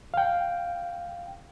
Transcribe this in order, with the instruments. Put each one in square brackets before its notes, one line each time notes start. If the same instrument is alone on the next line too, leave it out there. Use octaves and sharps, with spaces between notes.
[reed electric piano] F5 G5